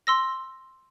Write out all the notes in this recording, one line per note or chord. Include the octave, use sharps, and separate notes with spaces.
C6 E6 A#6